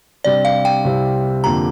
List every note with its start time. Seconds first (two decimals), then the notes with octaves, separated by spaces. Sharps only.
0.24 C3 G3 D4 G4 D5
0.45 F5
0.65 G5
0.85 C2 C3 G3 C4
1.44 F2 D3 A#3 G4 A#5